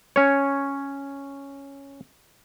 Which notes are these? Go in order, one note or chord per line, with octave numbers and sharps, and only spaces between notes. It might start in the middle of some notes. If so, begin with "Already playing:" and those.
C#4 C#5